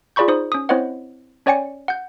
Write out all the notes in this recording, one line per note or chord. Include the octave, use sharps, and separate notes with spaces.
F4 G#4 D5 B5 C#6 G6
D#4 C5 D#6
C#4 D#6
C4 E4 C5 C#5 D#5 F#5
C#4 C#5 D5 G5 G#5 C#7
F#5 G6